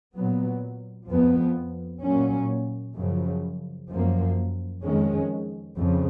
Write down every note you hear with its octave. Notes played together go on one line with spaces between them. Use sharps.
A#2 F#3 B3
F2 F3 B3
A#2 F#3 A#3 C#4
F#2 C#3 F3
F#2 F3 A#3
F2 D#3 G#3 C#4
F2 C#3 F3